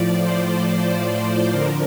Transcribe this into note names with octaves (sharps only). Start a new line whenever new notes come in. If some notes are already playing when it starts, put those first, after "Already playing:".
Already playing: A2 F3 D5
C5
F2 D3 F3 A#4